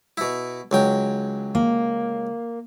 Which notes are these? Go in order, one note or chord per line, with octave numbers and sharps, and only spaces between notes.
B2 E4
C#2 F#3 G5
A#3